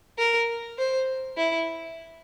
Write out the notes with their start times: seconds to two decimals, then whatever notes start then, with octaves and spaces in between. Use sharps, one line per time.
0.18 A#4
0.78 C5
1.37 E4